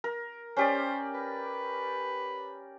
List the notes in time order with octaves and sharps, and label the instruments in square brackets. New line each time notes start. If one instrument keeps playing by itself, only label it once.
[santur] A#4
[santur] C#4 G4 D5 [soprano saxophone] C5
[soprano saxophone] B4